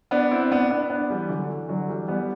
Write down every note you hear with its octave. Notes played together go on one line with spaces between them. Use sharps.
B3 D4
C4 E4
B3 D4
B3 D4
B3 D4
E3 G3
D3 F#3
E3
D3 F#3
E3 G3
G3 B3